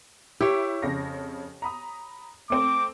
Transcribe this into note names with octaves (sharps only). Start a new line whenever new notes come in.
E4 G4 C#5
F2 C#3 A#6
A#5 B5 D#6
A3 C4 D6